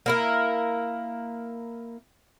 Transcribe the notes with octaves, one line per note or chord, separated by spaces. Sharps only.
A#3 E4 A#4